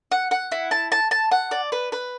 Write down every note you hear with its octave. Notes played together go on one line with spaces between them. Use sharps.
F#5
F#5
E4
A5
A5
A5
F#5
D5
B4
B4